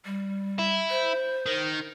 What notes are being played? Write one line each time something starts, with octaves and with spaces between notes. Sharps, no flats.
G3
E4
C5
D#3